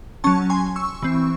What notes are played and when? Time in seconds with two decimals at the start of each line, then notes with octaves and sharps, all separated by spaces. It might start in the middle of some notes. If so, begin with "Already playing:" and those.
0.24 F#3 C#4 A5 C#6
0.50 G#5 C6
0.76 C#6 E6
1.03 E3 C4